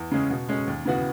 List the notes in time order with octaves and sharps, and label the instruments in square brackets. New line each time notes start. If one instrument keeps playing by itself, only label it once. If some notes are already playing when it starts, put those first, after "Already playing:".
Already playing: [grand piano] E2
C#3 G#3 C#4
B2
G#3 C#4
D#2
C#3 E3 B3 F#4